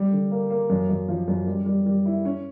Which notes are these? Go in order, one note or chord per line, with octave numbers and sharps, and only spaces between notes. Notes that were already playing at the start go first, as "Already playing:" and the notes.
Already playing: G3
D3
A#3
A#3
F#2
F#2
F3
F#2
G3
G3
G3
E4
C#4